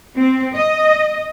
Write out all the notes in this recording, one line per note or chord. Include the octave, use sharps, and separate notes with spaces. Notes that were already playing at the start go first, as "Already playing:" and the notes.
C4
D#5